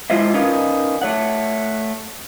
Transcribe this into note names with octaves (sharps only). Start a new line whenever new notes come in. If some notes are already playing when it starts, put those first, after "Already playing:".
G#3 E4 F4 C5 D#5 E5
C#4 D#4 A#4 B4 D#5 F5
A3 C#5 F#5